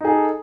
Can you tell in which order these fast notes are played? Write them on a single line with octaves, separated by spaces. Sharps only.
D#4 G#4 A4